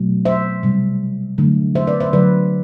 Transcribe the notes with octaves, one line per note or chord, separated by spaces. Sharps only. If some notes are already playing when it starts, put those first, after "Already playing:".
Already playing: B2 F#3 A3
C5 E5
C3 G3
D3 F#3 A3
C5 E5
B4 D5
C5 E5
D3 F#3 A3 B4 D5